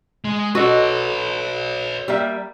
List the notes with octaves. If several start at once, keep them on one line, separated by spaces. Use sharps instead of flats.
G#3
F#4 A4 B4 C#5 D#5
G3 A#3 E5